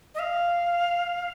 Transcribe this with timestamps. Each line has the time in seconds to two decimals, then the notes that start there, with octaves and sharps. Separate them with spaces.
0.15 D#5
0.19 F5